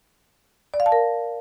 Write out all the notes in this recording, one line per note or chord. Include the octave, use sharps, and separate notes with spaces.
D5
F5
A5
A#4